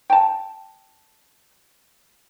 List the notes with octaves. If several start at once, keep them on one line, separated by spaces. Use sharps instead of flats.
G5 A5